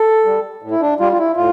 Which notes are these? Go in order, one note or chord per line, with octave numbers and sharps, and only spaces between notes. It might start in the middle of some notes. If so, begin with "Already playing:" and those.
Already playing: A4
G3
A2
E4
D4
G3 F4
F4
E4
A2 F4